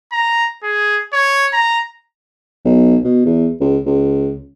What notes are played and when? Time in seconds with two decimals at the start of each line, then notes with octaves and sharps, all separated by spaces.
0.12 A#5
0.63 G#4
1.13 C#5
1.53 A#5
2.65 B1
3.04 B2
3.25 E2
3.61 C#2
3.86 C#2